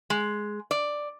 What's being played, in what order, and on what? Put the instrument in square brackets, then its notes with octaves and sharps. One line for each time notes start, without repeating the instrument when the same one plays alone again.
[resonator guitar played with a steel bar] G#3
D5